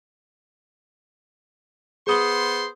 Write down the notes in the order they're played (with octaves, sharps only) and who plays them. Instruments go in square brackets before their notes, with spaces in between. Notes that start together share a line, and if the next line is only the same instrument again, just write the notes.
[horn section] B3 C5 C6 [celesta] G#4 D#6 G7